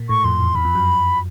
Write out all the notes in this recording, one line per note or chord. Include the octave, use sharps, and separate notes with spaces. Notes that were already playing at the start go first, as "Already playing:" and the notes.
Already playing: A#2
A2 C#6
F2 C6
E2
E2 B5
F2
F#2